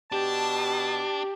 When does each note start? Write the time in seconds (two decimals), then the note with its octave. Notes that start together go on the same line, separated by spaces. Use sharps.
0.12 B2 D4 G4 A5